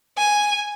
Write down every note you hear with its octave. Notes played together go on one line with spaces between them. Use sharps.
G#5